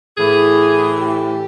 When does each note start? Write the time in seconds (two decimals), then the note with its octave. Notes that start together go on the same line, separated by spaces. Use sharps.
0.17 A2 E3 G#4
0.98 G4